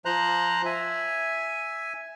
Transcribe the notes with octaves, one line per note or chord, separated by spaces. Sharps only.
F3 C5 A#5 F#6
E5 G#5